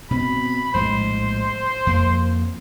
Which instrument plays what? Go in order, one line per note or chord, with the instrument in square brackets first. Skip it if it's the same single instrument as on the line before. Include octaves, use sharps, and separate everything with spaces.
[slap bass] B2 C4 [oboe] B5
[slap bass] A#1 A2 G#3 [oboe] C5
[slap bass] F2 A#3